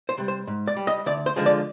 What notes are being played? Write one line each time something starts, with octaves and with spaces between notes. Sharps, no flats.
C5
C3 G3
C5
G#2
D5
G3
D#5
D2 D5
C5
D3 F3 G#3
D5